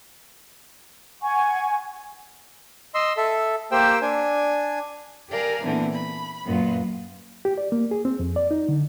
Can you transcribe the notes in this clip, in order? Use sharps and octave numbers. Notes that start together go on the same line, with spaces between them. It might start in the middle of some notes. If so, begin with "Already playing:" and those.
F#5 G#5 C#6
D#5 C6 E6
A4 E5
A#3 G4 C5 G5 E6
D4 G#5
G4 A4 A#4 D5 F5 G#5
A#2 D3 E3 B3 C4
B5
F#2 A#2 B3 F4
G4
D5
A#3
G#4
C4
F2
D5
D#4
D3